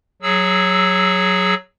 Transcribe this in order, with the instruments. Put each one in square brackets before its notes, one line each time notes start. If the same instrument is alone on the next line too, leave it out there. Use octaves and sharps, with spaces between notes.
[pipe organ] F#3 G#4 E6